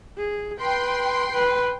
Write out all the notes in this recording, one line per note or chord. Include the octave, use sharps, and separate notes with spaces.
G#4
B4 G5 C6
B4